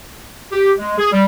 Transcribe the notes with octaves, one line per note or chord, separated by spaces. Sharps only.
G4
G#3
G#4
G3